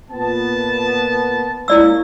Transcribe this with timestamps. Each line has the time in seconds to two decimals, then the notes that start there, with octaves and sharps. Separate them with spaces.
0.11 A#2 B3 A5
1.68 G#3 A#3 C#4 E4 D5 E6